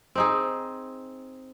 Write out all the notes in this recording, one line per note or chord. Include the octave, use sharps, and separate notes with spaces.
C4 D#4 G#4